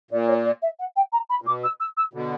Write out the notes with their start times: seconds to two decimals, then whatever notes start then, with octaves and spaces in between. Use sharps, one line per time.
0.11 A#2 D5
0.27 C#5
0.45 D5
0.62 E5
0.79 F#5
0.96 G5
1.12 A#5
1.29 B5
1.42 A#2
1.46 B2 D6
1.63 E6
1.80 E6
1.97 E6
2.13 B2 D3